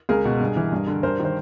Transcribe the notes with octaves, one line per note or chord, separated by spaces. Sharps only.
C#2 G#4 A#4
B2
G2
E3
G2
D3
G2 A#4 C5
D#3
C5